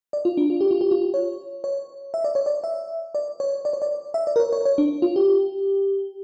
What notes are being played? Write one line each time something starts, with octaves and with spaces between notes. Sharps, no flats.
D5
F4
D4
F4
G4
F4
G4
F4
C#5
C#5
E5
D5
C#5
D5
E5
D5
C#5
D5
C#5
D5
E5
D5
A#4
C#5
C#5
C#5
D4
F4
G4